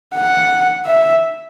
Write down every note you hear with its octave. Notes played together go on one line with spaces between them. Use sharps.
F#5
E5